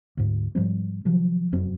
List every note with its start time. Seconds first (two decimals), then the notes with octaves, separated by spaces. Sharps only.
0.17 D2 G#2
0.55 G#2 F3 G3 C4
1.05 C3 D#3 F3 F#3
1.52 F1 F#2 C4